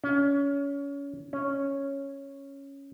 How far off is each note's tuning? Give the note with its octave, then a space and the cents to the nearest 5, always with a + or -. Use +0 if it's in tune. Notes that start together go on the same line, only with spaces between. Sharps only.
C#4 +25
C#4 -5